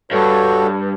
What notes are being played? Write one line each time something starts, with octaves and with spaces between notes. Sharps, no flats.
G2 F#4 A4 C#5